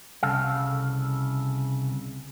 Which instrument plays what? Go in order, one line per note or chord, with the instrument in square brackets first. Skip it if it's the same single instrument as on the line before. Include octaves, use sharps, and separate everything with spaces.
[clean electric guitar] C2 C#3 A4 F5